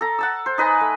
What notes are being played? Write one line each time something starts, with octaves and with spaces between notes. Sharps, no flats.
A4 A#5
F#5 A5 E6
C5
D#4 B4 D#5 G#5
A3